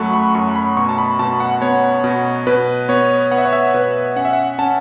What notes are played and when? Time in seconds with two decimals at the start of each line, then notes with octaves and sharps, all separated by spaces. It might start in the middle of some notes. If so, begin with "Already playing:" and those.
Already playing: F#2 F#3 A3 F#5 A5 B5 C#6
0.13 B5
0.35 F#2 C#6
0.56 B5
0.77 B2 C#6
0.89 A5
0.98 B5
1.19 B2 A5
1.40 F#5
1.62 B3 C#5
2.04 B2
2.47 B2 B4
2.89 B3 C#5
3.31 B3 F#5
3.38 E5
3.45 C#5
3.53 E5
3.74 B2 B4
4.16 C#4 F#5
4.25 E5
4.33 F#5
4.58 C#4 A5